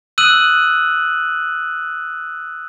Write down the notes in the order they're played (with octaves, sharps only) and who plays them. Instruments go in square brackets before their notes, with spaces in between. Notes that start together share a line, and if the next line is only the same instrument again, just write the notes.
[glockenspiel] D#6 E6 F#6 D#7 F#7